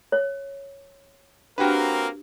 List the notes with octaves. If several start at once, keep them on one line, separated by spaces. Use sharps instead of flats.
C#5
A#3 C4 D4 F#4 G4 A#4 B4 G5